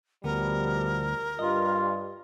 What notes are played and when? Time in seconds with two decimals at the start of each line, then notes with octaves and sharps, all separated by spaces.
0.24 D2 B2 F3 G3 B3 A#4
1.39 G2 F4 D#5